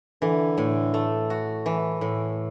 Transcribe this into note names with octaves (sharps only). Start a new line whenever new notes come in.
D3 E3
A2
A3
F#4
E3
A2